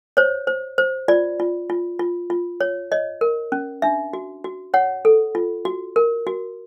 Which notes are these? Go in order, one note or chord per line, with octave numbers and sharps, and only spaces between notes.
C5 C#5
C5
C5
F4 D5
F4
F4
F4
F4
C#5
C#5 D#5
A#4
C#4
D4 E5
F#4
F#4
C#5 F#5
A4
F4
F#4
A#4
F#4